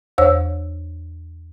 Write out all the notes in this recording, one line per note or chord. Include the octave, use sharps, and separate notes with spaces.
E2 C5 C#5 E6